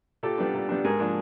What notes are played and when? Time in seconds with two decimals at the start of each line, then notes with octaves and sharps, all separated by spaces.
0.23 A#2 G4 A4
0.38 G3 B3 D4
0.54 A#2
0.69 G3 B3 D4
0.84 G#2 G#4 A#4
1.00 F3 A#3 D4